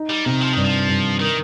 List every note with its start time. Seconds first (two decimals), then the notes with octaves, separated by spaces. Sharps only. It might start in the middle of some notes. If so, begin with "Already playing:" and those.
Already playing: D#4
0.10 G3
0.25 C3 D#3
0.41 F3
0.53 G2 D#3
0.65 F3
0.89 G2
1.20 D#3 A#4